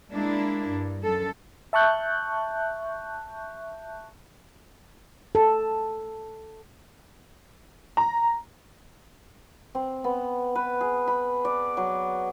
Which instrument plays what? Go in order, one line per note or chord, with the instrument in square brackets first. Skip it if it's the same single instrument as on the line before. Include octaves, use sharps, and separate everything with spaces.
[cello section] G#3 A#3 D4 E4
G2
F#2 A4
[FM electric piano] E5 A5 C#6 F#6 G6
[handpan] A4
[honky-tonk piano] A#5
[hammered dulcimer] C4
B3
B4
G#4
B5
D5
F#3